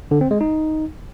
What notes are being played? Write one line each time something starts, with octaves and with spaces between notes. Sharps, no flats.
D3
C4
G#3
D#4